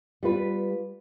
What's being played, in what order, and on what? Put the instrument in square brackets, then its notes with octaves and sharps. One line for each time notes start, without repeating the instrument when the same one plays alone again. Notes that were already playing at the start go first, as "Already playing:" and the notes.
[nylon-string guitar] G3 F4 B4